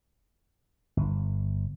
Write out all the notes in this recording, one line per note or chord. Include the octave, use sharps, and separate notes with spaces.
G1